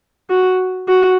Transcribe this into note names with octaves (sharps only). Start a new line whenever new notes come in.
F#4
F#4